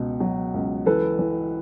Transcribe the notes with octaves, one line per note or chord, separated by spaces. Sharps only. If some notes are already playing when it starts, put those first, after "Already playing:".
Already playing: C#2 B2
F#3
C#2
E3 A4 B4
E3